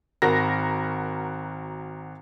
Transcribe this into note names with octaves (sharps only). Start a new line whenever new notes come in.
G#1 F#4 A#4 A#6